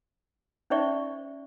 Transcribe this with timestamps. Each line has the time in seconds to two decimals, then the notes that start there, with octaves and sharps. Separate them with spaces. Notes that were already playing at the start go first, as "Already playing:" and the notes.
0.70 C#4 D#4 C5 D5 E5 C#6